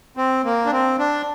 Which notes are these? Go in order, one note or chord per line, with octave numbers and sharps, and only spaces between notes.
C4
A#3
D4
C4
D4